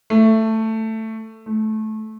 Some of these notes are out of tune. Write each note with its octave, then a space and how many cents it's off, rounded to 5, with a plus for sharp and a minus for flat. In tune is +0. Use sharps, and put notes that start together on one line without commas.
A3 +10
A3 -20